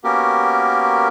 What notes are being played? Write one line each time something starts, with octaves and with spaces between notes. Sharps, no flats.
A#3 B3 C#4 F#4 G4 A#4